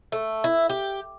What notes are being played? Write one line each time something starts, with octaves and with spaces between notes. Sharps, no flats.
A3
E4
G4